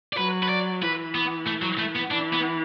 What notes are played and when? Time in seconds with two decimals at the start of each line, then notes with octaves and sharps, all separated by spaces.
0.13 D5
0.17 F#3 B4
0.43 B4
0.50 D5
0.82 E3 B4
1.15 B3
1.47 A3
1.63 F#3
1.79 A3
1.96 B3
2.11 E3 D4
2.33 B3